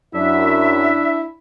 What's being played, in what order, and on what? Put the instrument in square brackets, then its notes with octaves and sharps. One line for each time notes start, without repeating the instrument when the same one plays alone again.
[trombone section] F#2 [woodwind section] D4 E5 [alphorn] E4